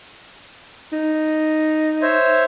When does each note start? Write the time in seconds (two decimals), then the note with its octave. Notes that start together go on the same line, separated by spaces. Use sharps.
0.93 D#4
2.02 C5 C#5 E5